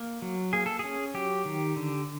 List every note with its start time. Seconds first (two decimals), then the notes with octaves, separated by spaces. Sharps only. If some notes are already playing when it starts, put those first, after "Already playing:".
Already playing: A#3
0.22 F#3
0.53 A#3 G#4
0.66 A4
0.79 C#4 G#4
1.14 F#3 G4
1.45 D#3
1.76 D3